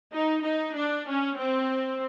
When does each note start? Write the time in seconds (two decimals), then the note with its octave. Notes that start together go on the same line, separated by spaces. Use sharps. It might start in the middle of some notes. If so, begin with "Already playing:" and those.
0.13 D#4
0.43 D#4
0.74 D4
1.06 C#4
1.37 C4